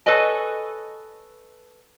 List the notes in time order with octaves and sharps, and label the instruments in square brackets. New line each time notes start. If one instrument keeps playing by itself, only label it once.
[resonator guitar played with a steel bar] A4 B4 C#5 D#5 G#5